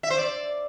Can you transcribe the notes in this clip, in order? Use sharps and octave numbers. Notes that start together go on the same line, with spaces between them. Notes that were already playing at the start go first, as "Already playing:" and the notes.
E5
C5
D5